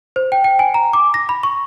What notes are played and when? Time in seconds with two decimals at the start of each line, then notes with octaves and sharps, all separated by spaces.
0.16 C5
0.32 G5
0.44 G5
0.59 G#5
0.74 A#5
0.93 D6
1.14 A#6
1.29 B5
1.43 C#6